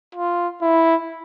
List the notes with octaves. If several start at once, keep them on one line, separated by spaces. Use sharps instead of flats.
F4
E4